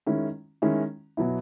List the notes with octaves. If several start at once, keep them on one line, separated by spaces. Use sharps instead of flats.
D#3 G#3 C#4 E4
D#3 G#3 C#4 E4
B2 F#3 B3 E4